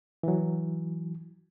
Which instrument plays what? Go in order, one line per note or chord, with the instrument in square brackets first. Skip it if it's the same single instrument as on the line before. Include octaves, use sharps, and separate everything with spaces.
[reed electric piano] E3 F#3